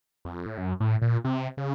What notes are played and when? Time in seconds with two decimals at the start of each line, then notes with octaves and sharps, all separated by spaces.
0.25 F2
0.46 A2
0.58 F#2
0.80 A2
1.02 A#2
1.24 C3
1.57 C#3